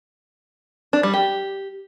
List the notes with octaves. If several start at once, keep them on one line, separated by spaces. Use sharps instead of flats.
D4
G3
G4